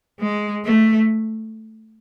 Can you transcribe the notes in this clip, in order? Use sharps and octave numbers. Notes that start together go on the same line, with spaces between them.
G#3
A3